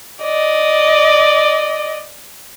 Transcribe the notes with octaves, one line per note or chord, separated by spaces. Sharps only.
D5 D#5